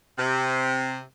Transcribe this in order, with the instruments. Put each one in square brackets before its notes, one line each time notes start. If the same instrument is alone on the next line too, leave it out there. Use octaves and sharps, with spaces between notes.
[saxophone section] C3